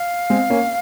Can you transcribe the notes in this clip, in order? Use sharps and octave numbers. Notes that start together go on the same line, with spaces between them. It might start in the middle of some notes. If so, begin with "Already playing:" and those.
Already playing: F5
G#3 C4
A#3 C#4